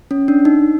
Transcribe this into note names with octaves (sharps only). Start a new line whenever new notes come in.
C#4
D4
D#4